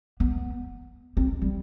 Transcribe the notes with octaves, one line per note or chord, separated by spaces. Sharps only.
B3
C4
G3